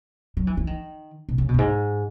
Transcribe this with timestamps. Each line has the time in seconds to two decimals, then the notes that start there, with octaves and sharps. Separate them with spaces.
0.37 F#3
0.47 E3
0.57 E3
0.67 D#3
1.29 B2
1.38 C#3
1.49 B2
1.54 F#2
1.59 G#2